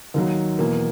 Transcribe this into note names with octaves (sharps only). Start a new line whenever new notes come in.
D#2 D#3 F#3
E2 B2 A#3